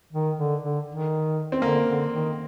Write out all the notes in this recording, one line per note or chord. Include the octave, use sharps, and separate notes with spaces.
D#3
D3
D3
D#3
C4
D3 A#3
D3
D#3